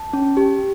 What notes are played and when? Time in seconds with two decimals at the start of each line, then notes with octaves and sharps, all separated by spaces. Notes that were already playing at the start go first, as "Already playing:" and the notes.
Already playing: A5
0.13 C#4
0.37 G4